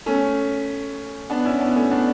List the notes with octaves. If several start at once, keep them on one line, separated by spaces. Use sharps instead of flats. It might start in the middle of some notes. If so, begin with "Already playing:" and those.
A3 C#4
B3 D4
C#4 E4
B3 D4
A3 C#4
B3 D4